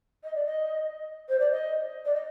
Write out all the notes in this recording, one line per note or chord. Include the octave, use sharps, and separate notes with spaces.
D#5
D5
D#5
C5
D5
D#5
D5
D#5